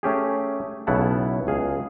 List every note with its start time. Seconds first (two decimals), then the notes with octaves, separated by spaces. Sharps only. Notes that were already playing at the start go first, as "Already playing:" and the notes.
0.03 A3 C#4 G4 G#4
0.87 B1 C#3 B3 E4 F#5 A5
1.47 C#2 G#4 F5